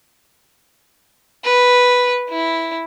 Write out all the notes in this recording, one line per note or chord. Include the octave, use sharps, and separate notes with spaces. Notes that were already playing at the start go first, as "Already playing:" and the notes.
B4
E4